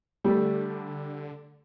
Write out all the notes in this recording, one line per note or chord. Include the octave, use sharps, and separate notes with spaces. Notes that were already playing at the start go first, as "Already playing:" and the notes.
D3 G3 A3